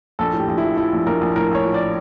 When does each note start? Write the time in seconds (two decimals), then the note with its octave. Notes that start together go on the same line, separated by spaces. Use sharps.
0.19 A#1 A4
0.33 A2
0.39 G4
0.48 A#1
0.58 E4
0.63 F3
0.77 F3 E4
0.92 A#1
1.06 A#1 A#4
1.21 A#1
1.36 A2 A#4
1.51 A#1 C#5
1.64 F3
1.74 D5